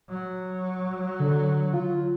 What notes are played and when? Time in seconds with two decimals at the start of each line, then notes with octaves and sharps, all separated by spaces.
0.10 F#3
1.20 D3
1.74 F4